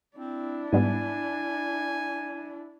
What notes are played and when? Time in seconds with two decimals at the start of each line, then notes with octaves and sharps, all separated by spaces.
0.17 C4 D4 E4
0.73 G#2 G3 B3 G#5